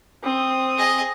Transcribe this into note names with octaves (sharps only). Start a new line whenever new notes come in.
C4 D#6
G#4 D#5